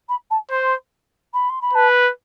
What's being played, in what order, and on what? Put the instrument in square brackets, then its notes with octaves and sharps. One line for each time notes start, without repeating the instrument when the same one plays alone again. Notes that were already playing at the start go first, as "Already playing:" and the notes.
[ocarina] B5
A5
[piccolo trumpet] C5 [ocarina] C6
[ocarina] B5
C6
B5
[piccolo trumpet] B4 [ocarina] A5